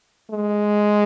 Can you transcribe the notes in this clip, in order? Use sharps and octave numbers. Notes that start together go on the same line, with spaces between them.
G#3